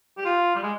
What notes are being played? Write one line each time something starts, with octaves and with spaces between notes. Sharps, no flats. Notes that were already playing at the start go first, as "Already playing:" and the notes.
G4
F4
G3
G#3